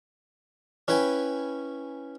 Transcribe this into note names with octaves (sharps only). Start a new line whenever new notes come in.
C#4 E4 B4 G5 G#5